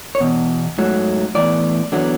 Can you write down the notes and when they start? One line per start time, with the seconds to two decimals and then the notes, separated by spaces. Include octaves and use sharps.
0.15 C#5
0.20 E2 B2
0.78 G#2 F#3 A3
1.35 A2 E3 B3 D5
1.92 E2 D3 F#3 B3